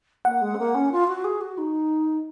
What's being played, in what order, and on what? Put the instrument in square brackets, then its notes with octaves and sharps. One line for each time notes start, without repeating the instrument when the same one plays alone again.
[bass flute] A#3 [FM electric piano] F#5
[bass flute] G#3
C4
A#3
C#4
F4
F#4
G#4
F#4
D#4